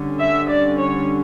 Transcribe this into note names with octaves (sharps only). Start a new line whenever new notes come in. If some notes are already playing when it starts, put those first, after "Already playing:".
Already playing: D3 G3 C#4
E5
D5
C#5